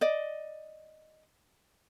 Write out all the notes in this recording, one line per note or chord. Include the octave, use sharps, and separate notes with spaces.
D5 D#5